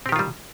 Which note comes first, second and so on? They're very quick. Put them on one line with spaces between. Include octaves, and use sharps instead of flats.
C4 G4 D#3 F4 G3